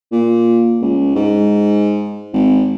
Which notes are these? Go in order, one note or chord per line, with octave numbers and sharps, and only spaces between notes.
A#2
C#2
G#2
G#1